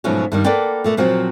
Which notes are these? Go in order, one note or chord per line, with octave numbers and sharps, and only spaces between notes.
G#2 B2 F3 F#3 A3 C#4
G2 D#3 G3
A#3 A4 B4 D5 F#5 G5
A#2 A3 B3
A#2 F3 F#3 C4 F4 F#4